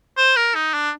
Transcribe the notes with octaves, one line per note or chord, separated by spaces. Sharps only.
C5
A#4
D#4
D4